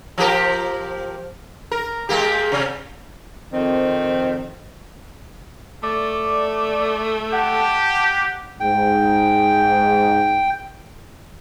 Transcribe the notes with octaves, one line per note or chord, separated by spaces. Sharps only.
F3 G4 A#4
A#4
G#3 A#3 G4
C3
F2 D#3 C4
A3 D5 D6
G4 F#5 A5
G#2 G5